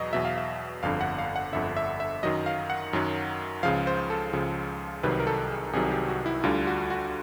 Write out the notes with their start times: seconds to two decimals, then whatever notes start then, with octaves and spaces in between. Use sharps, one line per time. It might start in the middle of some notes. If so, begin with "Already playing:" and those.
Already playing: E2 B2 F#3 D#5
0.12 E2 B2 F#3 E5
0.25 F5
0.38 E5
0.83 G1 F2 D3 F5
1.01 F#5
1.18 F5
1.36 F#5
1.52 G1 F2 D3 E5
1.76 E5
2.00 E5
2.23 F#2 D#3 F#3 D#5
2.46 F5
2.70 F#5
2.93 F#2 D#3 F#3
3.63 C#2 C#3 F3 F5
3.87 C5
4.10 A4
4.33 C#2 C#3 F3
5.03 C2 C3 D#3 F#3 B4
5.20 A#4
5.27 A4
5.50 G#4
5.73 C2 C3 D#3 F#3 G#4
5.84 G#4
5.91 G4
6.08 F#4
6.26 E4
6.43 D2 D3 G3 F4
6.67 F#4
6.90 F#4